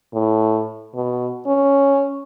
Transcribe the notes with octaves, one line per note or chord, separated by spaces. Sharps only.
A2
B2
C#4